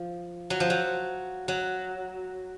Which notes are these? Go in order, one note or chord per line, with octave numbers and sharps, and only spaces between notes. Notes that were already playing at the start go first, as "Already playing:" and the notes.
Already playing: F3
F#3
F3
F#3
F#3